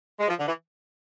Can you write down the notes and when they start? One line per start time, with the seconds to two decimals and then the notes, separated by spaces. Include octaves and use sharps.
0.19 G#3
0.27 F3
0.38 D3
0.47 E3